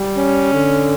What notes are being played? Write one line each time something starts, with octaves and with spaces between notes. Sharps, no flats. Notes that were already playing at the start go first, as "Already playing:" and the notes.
Already playing: G3
C#4
D3